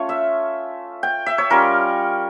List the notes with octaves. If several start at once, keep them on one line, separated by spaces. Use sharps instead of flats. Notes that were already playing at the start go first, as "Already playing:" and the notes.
Already playing: A3 C#4 F4 C#5
E5
G5
E5
C#5
G3 C#4 F4 A#4